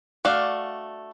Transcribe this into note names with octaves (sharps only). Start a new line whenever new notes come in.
A3 D4 F#4 D5 F5